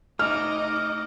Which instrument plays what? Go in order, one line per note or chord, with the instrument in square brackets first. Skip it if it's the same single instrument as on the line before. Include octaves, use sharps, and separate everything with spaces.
[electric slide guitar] A3 D#4 [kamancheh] D#5 D6 [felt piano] F6